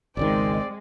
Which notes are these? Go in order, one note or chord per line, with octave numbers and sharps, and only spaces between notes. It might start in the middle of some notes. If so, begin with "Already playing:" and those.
G#1 C#2 D#3 G#3 C4 D5